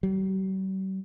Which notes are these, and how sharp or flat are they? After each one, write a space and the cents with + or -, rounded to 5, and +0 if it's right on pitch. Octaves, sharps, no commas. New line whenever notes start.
G3 -45